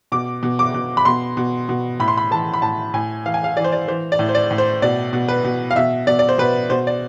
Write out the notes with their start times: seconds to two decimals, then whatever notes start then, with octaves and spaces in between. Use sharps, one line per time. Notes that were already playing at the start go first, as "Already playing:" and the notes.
0.12 B2 D6
0.43 B2
0.59 D6
0.74 B2
0.97 B5
1.05 B2 C6
1.37 B2
1.69 B2
1.99 A2 B5
2.08 C6
2.18 B5
2.31 E3 A5
2.54 B5
2.62 A2 A5
2.93 A2 G#5
3.25 E3 F5
3.34 G#5
3.44 F5
3.57 E3 D5
3.64 C5
3.72 D5
3.88 E3 C5
4.12 D5
4.19 A2
4.29 C5
4.35 D5
4.51 A2
4.58 C5
4.82 B2 D5
5.13 B2
5.28 B4
5.44 B2
5.71 F5
5.76 B2 E5
6.07 B2 D5
6.19 D5
6.29 C5
6.38 B2 B4
6.70 B2 C5
6.87 D5